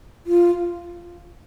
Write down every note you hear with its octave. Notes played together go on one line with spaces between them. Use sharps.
F4